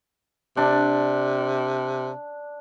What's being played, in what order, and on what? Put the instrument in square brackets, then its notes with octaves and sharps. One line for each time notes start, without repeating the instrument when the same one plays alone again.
[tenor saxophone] C3 [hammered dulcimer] D4